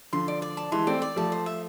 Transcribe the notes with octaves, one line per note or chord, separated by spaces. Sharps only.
D3 F3 C6
D5
D5
A5
E3 G#3 C6
A3 C4 D5
D5
F3 A3 A5
C5
E5